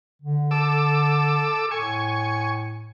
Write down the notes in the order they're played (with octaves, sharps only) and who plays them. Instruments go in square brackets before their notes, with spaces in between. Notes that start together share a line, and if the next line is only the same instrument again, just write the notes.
[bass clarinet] D3
[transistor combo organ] A4 D6 E6
[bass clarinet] A2 [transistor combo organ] G#5 C#6